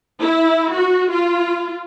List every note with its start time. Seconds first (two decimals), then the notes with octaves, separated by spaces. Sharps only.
0.21 E4
0.74 F#4
1.12 F4